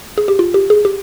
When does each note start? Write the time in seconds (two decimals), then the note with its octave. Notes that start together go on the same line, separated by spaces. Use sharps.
0.18 G#4
0.28 G4
0.39 F4
0.54 G4
0.70 G#4
0.85 G4